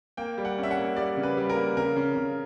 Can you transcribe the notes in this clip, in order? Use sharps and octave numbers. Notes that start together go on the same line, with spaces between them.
A#3 G5
G3
F#5
C#4
E5
F#5
A#3
G3 D5
C#3
B4
G3
A#4
A#3
C#3 A#4
C#3
C#3